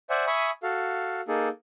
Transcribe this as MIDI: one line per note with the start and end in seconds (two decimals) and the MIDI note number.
0.10 0.25 72
0.10 0.25 74
0.10 0.25 76
0.10 0.25 78
0.10 0.25 80
0.27 0.50 76
0.27 0.50 80
0.27 0.50 83
0.27 0.50 85
0.27 0.50 87
0.63 1.21 66
0.63 1.21 69
0.63 1.21 77
1.28 1.49 58
1.28 1.49 63
1.28 1.49 68
1.28 1.49 69